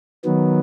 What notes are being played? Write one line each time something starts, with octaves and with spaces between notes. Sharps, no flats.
D#3 F#3 B3